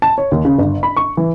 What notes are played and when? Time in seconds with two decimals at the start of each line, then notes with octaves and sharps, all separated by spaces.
0.02 A5
0.18 C#5
0.32 D#2
0.45 C#3
0.58 G1
0.83 B5
0.97 C#6
1.17 E3